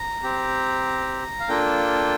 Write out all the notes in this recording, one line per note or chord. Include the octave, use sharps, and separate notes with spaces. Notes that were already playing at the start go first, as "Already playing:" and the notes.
Already playing: A#5
C4 G4
F5
A#3 D4 F4 A4 G5